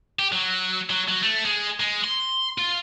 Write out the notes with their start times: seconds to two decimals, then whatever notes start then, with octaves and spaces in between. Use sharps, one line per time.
0.19 G4
0.32 F#3
0.90 F#3
1.08 F#3
1.22 A3
1.45 G#3
1.80 G#3
2.04 C6
2.58 F4